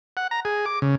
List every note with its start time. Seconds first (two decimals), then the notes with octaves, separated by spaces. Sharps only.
0.17 F#5
0.31 A#5
0.45 G#4
0.66 D6
0.82 C#3